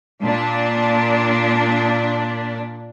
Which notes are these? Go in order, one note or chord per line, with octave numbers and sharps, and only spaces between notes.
A#2 D4